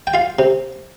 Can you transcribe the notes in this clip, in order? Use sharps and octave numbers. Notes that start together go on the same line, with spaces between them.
G5
F4 F5
C3